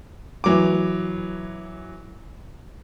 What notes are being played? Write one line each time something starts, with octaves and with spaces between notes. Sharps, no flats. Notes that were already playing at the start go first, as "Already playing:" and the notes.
E3 F#3 D6